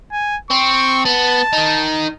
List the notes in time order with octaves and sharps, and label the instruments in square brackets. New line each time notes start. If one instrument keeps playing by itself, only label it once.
[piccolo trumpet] G#5
[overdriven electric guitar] C4 [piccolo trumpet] C#6
[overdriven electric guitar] B3 [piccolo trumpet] A5
[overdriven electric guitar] D#3 D#4